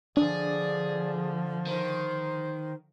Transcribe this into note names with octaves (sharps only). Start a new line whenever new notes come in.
D3 F3 D4 G#4 D5
D#3 C5